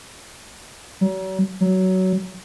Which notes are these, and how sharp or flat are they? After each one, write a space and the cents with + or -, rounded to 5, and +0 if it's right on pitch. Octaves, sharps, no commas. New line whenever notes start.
F#3 +40
F#3 +15